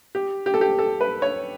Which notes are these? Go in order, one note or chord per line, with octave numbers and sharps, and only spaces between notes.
G4
G4
A4
G4
A4
B4
C#5